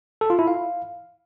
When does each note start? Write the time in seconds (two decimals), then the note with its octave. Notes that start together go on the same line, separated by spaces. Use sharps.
0.21 A4
0.30 F4
0.39 E4
0.48 F5